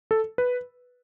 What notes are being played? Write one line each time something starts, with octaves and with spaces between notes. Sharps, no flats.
A4
B4